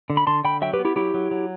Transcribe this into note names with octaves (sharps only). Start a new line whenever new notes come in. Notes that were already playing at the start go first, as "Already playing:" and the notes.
D3
B5
D3 A5 C6
D3 G5 B5
F#3 E5 G5
G4 B4
B3
E4 G4
F#3 E4 G4
F#3
F#3